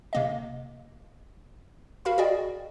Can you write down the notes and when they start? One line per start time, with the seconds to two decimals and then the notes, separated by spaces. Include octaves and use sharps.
0.13 C3 A#3 D#5
2.05 F#4 A#4 F5 B5
2.18 F#4 G#4 D5 D#5 G5